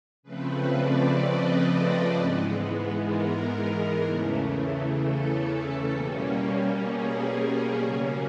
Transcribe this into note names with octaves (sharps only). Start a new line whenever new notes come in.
C#3 F3 A3 C4 B4
D5
D#5
G#2 E3 G#3 B3
A#4
E2 C#3 E3 A3
A4
B2 G3 A#3 C#4
G#4
C#3 F#3 A#3 C#4